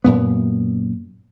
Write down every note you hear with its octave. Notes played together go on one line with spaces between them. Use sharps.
F#2 A#2 B3